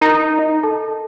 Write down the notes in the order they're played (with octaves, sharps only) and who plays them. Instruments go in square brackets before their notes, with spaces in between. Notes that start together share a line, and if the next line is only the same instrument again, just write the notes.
[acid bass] D#4 [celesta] A#4 A#5
[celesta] A4 A5